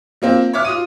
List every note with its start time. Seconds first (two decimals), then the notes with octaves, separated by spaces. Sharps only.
0.22 F3 A#3 C4
0.53 C#5 E5 D6 F6
0.65 F4 D#6 D#7